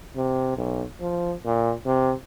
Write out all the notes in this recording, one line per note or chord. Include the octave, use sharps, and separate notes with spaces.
C3
B1
F3
A#2
C3